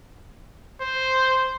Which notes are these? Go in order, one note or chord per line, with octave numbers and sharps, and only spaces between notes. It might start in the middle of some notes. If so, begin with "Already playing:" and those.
C5